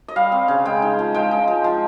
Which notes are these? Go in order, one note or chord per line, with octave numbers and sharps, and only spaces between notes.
D#5
G3 F5
C4
C#3
G#3 G5
D#4
F3
G#3 G5
D#4
F3
F3